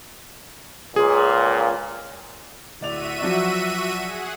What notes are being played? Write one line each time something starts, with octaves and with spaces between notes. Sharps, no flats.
C#2 A#2 G#4
D1 F#4 D5 E5 D#7 F7
F3 F#3 D5
G#4 F#5